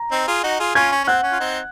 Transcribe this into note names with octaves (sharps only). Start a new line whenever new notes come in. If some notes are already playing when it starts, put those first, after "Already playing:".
Already playing: A#5
C4 D#4
F4 G#4
D#4 F#4
F4 G#4
C#4 F4 G#5 G#6
C#4
C#4
C4 F#5 F#6
C#4
F4
C4 D#4